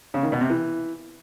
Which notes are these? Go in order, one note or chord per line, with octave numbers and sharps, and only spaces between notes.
C#3
D#3
B2
C3
E3